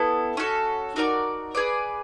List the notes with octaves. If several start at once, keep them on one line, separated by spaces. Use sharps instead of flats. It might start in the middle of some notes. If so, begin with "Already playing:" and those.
Already playing: B3 E4 A4
C#4 F#4 A4
D#4 F#4 A#4 D5
G#4 B4 D5